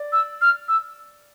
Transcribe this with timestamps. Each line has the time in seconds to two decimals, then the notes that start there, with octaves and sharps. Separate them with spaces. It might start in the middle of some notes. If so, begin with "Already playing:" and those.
Already playing: D5
0.13 E6
0.41 F6
0.68 E6